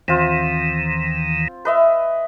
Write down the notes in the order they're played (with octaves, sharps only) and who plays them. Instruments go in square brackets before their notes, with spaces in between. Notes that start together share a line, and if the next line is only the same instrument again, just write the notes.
[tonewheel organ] D#2 D#3 E3 [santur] C4 F4
[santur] B4 D#5 E5